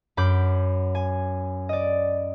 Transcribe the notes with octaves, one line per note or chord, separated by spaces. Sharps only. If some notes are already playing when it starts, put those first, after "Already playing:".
F#2 B5 D6 G6
G#5
D5 D#5